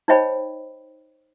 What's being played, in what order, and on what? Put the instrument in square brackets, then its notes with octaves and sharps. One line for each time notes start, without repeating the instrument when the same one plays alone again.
[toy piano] D#4 C5 C#5 D#5 G5 B5